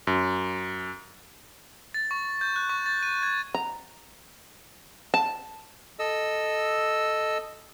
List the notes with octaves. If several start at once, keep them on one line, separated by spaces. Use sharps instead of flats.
F#2
A6
C#6
G6
F#6
C#6
A6
D#7
G#6
A#5
A5
A4 D#5 E6